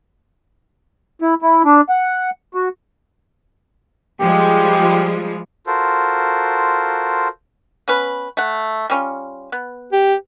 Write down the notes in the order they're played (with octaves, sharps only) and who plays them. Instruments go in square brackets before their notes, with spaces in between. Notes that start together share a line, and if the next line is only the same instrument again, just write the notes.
[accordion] E4
E4
D4
F#5
F#4
[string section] F3 G3 G#3 [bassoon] G4
[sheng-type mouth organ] F4 F#4 A4 A#4 C5
[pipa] B3 C#4 B4
A3 F#5
G3 C#4 F4
B3
[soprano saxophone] G4